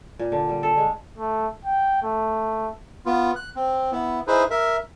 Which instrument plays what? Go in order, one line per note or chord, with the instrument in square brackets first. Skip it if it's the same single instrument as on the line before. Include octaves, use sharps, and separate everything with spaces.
[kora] A#2
D3
G3
A4
G#3
[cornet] A3
G5
A3
[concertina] B3 F4
F#6
C4
B3 E4
D#4 E4 G#4 B4 C5
A#4 E5